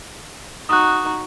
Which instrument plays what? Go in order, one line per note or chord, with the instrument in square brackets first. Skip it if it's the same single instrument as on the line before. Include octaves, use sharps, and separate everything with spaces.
[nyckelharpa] D#4 F#4 [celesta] D#6 F#6